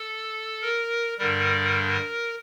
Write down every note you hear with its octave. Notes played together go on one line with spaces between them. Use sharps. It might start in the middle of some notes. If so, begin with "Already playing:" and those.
Already playing: A4
A#4
G2 D3 G3 A#4